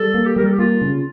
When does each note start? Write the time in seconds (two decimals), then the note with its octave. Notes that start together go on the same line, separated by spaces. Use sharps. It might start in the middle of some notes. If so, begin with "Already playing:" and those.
Already playing: G3 A4
0.14 A#3
0.26 G4
0.36 G3 A#4
0.45 A4
0.52 G4
0.59 A#3 F4
0.81 C#3